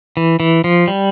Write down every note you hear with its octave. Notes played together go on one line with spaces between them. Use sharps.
E3
E3
F3
G3